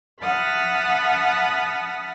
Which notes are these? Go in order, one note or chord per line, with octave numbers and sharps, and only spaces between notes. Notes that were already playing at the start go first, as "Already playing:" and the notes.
E5 F#5 A5 B5 D#6 F6